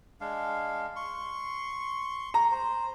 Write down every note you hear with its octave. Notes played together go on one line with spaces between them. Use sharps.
G#3 D4 F5
C6 C#6
A#5
C5